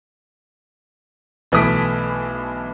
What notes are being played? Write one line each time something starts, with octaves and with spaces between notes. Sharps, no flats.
B1 E3 A3 D#6 B6 D7